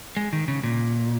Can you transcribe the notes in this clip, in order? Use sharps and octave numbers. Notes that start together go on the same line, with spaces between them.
G#3
D#3
C#3
A#2